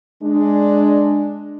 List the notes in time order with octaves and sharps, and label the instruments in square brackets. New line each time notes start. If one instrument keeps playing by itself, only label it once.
[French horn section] G#3 D4